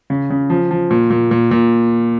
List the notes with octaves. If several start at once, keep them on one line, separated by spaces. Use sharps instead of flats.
C#3
C#3
F3
F3
A#2
A#2
A#2
A#2